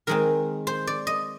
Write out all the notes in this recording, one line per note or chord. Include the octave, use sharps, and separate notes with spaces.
D#3 G#3 C4 A#4
C5
D5
D#5